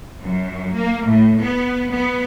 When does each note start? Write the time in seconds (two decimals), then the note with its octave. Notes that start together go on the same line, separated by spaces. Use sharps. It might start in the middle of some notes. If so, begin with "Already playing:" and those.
0.22 F#2
0.74 A#3
1.07 A2
1.41 B3
1.91 B3